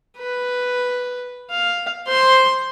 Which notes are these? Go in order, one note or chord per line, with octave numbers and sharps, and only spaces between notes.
B4
F5
C5 C6